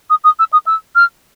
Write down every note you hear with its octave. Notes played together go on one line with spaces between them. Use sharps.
D#6
D#6
E6
D#6
E6
F6